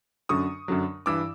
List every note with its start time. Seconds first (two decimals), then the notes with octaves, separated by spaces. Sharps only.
0.29 F#2 D3 F#3 C#6 D#6
0.68 F#2 D3 F#3
1.06 G2 E3 D6 E6